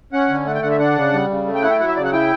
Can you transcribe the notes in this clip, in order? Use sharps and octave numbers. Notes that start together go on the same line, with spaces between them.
C#4 F#5
D3
A3 F#5
G5
D3 F#5
E5
D4 F#5
C#3
G3
C#3
A3
G5
E4 F#5
G5
F#3 F#5
E5
C#3 D5
F#5
E4 G5